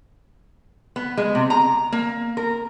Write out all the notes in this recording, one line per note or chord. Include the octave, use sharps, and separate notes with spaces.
B3
G#3
C3
A#5
A#3
A#4